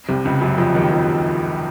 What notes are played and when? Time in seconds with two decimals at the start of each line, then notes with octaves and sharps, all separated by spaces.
0.09 C2 C3
0.25 C#2 C#3
0.41 F#2 F#3
0.58 F2 F3
0.74 D#2 D#3
0.91 F2 F3